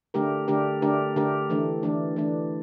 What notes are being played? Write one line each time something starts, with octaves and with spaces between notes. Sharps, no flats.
D3 A3 D4 G4 A#4
D3 A3 D4 G4 A#4
D3 A3 D4 G4 A#4
D3 A3 D4 G4 A#4
E3 A3 D4
E3 A3 D4
E3 A3 D4